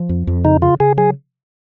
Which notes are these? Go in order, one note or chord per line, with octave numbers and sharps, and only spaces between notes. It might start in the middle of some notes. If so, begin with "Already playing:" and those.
Already playing: F3
F2
F2
C#3 D#4
C#3 F4
C#3 G#4
F#3 G#4